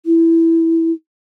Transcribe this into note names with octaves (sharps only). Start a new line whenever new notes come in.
E4